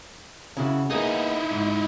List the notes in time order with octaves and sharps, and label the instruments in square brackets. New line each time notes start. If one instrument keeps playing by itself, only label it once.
[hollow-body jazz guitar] C#3 E4 F#4
[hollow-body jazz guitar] A#3 B3 G#4 [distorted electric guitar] D#4 E4
[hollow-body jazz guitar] G#2